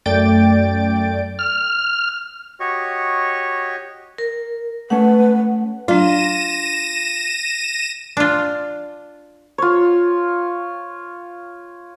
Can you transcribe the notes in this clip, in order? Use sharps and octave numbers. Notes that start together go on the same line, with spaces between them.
F#2 A3 D5 G5 A6 D7
F6
F#4 G4 C#5 D#5 C#6
A#4
A3 C#4 B4 F#5
F#3 D4 F4 A#6 D#7 E7
D4 F4
F4 C#5